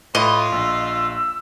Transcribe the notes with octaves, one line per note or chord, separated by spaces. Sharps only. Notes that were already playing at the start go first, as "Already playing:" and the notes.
A2 F4 D#5 B5
A#1 E6